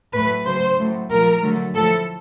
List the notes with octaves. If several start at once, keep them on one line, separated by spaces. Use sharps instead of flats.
A2 F#3 A3 B4
C#3 F#3 A3 C5
A2 F#3 A3
A#2 F3 A3 A#4
D3 F#3 A3
A2 F3 A3 A4